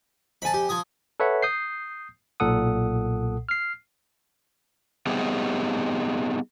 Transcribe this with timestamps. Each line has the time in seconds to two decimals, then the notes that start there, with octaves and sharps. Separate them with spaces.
0.42 F2 G#5 A5 B5
0.54 G4
0.69 F3 G#5 D#6
1.20 A4 B4 C#5 E5 F#5
1.43 D#6 G6 C7
2.40 B1 A#2 A4 F#5 D#6
3.49 F6 C7
5.07 G3 B3 C4 D#4 G4 G#4